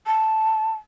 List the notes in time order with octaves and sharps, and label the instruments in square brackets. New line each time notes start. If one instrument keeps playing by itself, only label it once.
[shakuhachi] A5